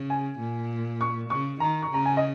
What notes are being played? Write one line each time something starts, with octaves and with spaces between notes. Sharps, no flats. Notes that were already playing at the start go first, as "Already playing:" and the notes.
Already playing: C#3
G#5
A#2
C#6
C#3 C#6
D#3 A#5
C#6
C#3 A#5
G#5
D#5